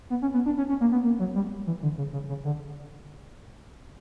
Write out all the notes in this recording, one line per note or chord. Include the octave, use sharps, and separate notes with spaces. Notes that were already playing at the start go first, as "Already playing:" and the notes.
B3
C#4
B3
D4
C#4
C#4
A#3
B3
A#3
F#3
G3
E3
D3
C#3
C#3
C#3
D3